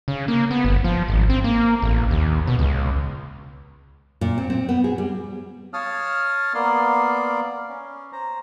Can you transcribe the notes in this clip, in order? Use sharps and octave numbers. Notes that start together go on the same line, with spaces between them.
C#3
A#3
B3
G1
F3
G#1
C4
A#3
A1
D#2
B2
C#2
A#2
C4
C4
B3
G#4
G3
C#5 F5 A5 D#6 F6
A#3 B3 A#4 D5 F5 C6
C#4
C5 A#5